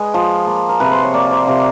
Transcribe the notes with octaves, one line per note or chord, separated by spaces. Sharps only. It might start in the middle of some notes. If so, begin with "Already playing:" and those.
Already playing: G#3 B4 D#5
F3
A#3
A#4
C3 B4
C5
C#5
A#3 D5
C5
C3 C5